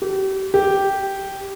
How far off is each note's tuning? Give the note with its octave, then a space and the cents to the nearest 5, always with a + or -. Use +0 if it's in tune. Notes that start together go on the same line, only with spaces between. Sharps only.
G4 -35
G4 -5